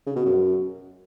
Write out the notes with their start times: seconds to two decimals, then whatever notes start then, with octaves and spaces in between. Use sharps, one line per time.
0.07 C#3
0.16 B2
0.25 F#2